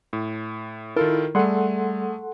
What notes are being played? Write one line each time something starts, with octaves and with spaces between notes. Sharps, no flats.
A2
D#3 E4 F4 A4 A#4
G3 A3 G#4 A4 F#5 C6